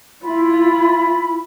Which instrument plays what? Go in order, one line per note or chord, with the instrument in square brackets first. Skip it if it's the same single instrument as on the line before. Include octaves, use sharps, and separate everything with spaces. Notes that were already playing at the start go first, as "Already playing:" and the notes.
[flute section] E4 B5 [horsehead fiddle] F4